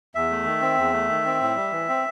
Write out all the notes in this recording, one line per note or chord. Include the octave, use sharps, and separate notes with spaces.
E2 E5
A3
D#3
C4
E2
A3
D#3
C4
A2
G3
E3
C4